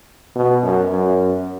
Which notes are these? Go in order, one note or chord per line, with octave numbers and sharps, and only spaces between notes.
B2
F#2
F#2